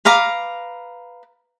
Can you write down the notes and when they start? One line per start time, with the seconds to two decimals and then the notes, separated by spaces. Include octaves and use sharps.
0.05 B4 F5 A#5 D6